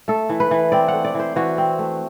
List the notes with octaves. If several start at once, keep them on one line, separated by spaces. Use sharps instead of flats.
A3 A4
E3
B4
E3
C4 D5
F#5
A3
D5
E3 C5
E3 F#4
C4
A3